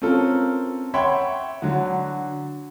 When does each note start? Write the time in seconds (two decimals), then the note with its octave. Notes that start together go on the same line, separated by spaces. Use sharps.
0.02 C4 C#4 F4 A4 A#4
0.94 C#5 E5 F#5 G5 B5 C6
1.62 D3 F#3 F#4